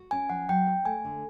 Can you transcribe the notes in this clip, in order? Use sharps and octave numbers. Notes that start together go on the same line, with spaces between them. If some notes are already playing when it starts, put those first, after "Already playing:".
Already playing: F#4
C#4 G#5
F3 F#5
F#3 G5
C4
A3 G#5
D3